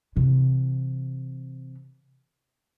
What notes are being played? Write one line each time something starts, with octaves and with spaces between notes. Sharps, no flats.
C3 E3